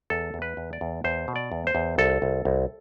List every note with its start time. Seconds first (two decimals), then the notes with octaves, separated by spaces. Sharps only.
0.10 E2 A4
0.34 E2
0.42 B4
0.57 E2
0.73 D5
0.81 E2
1.04 E2 C5
1.28 B2
1.36 D5
1.52 E2
1.67 C5
1.75 E2
1.98 C2 A4
2.22 C2
2.45 C2